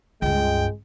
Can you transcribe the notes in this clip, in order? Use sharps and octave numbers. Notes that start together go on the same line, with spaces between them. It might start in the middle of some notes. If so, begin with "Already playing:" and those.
C#2 G2 G#3 G5